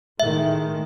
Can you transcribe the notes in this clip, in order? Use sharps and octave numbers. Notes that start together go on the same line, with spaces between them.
A2 D#3 G#3 E5